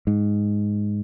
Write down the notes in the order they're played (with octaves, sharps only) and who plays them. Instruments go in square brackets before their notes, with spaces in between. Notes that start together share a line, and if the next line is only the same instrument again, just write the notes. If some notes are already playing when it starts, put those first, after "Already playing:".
[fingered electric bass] G#2